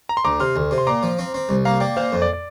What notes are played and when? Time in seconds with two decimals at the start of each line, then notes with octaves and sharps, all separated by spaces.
0.09 A#5
0.17 C6
0.25 D2 A#5 D6
0.40 C3 C6 F6
0.56 D2
0.71 C3
0.78 C6
0.87 A#2 A#5 D6
1.03 F3
1.19 C4
1.34 C4
1.49 C2
1.65 A#3 F5 A#5
1.80 A#3 D5 G5
1.96 A#2 C5 F5
2.12 F2 C5
2.22 D5
2.33 D5